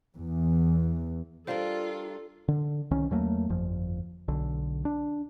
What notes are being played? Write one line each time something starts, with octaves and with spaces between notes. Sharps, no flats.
E2
G3 D4 F4 A4 A#4 C5 F5
D3
C2 D#3 C#4
E2 F#3 A3 A#3
G1 F2 F3
B1 D3
D4